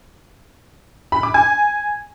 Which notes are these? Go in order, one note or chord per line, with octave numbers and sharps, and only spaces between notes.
B5
D6
G#5